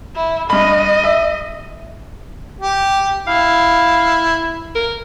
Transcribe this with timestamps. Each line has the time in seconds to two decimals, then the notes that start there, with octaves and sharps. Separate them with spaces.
0.15 E4
0.50 G2 D#5 B5
1.04 E5
2.61 G4
3.27 E4 F5
4.75 A#4